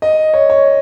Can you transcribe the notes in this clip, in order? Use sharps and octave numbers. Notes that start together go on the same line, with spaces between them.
D#5
C#5
C#5